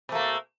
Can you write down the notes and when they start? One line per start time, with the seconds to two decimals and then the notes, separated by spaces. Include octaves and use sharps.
0.09 B2
0.12 A3
0.15 A#3